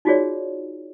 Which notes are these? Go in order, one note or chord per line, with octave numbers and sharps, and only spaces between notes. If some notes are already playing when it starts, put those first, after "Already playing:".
D#4 F4 F#4 G#4 C#5 D5